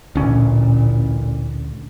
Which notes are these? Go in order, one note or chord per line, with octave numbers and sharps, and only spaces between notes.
A1 D2 A#2 C#4